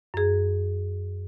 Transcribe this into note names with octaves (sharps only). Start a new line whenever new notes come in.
F#2 G#4